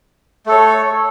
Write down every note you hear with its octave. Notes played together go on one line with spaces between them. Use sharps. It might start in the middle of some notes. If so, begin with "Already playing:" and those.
A3 A4 C#5